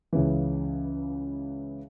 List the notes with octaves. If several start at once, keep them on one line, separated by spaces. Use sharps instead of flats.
C#2 C#3 E3